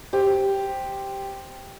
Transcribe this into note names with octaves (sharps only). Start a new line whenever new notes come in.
G4 C5